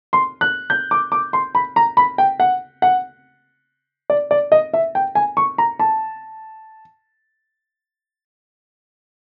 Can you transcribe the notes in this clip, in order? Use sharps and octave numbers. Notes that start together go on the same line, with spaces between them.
C6
F#6
G6
D6
D6
C6
B5
A#5
B5
G5
F#5
F#5
D5
D5
D#5
E5
G5
G#5
C#6
A#5
A5